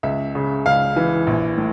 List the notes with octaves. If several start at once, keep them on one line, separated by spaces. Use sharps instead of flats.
C#2 E5
C#3
C#2 F5
E3
A#1
A2